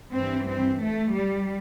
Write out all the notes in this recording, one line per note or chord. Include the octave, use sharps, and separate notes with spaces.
G2 E3 C4
C4
A3
G3